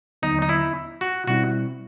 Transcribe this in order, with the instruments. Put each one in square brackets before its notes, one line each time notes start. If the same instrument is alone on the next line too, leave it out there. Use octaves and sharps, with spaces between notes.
[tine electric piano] D#2 D3 F#3 B3 [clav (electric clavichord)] D#4
[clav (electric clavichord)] D#4
E4
F#4
[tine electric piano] B2 G3 C4 E4 [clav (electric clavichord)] F#4